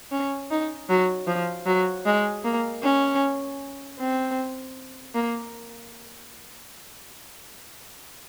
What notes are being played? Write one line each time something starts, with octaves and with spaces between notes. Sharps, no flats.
C#4
D#4
F#3
F3
F#3
G#3
A#3
C#4
C4
A#3